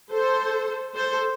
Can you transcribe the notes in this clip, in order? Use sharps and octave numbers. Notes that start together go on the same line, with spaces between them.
A4 C5
A4 C5